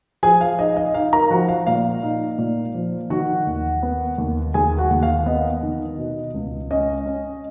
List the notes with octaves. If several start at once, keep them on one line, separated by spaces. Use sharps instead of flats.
F3 G#4 G#5
F5
D#4 D#5
D#5
D#4 F5
A#4 A#5
F3 F#4 F#5
F5
A#2 F5
D#4
A#2
F3
D#3 F#4 F#5
D#2
B3
D#2
D#2 G#4 G#5
F#4 F#5
D#2
F5
B3 D#5
D#3
B2
C#2
C#4 D#5
C#4